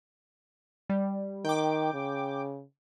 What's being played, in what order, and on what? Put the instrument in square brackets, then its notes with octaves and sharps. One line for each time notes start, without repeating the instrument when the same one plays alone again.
[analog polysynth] G3
[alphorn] D#3 [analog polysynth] G5 D6
[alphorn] C#3